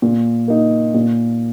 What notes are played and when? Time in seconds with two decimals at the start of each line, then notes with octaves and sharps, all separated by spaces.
0.02 A#2
0.48 A#3 D#4
0.94 A#2